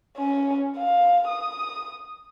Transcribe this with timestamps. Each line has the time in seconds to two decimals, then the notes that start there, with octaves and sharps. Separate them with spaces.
0.18 C#4
0.77 F5
1.28 D#6